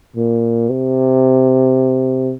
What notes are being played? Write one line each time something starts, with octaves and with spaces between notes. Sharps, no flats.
A#2
C3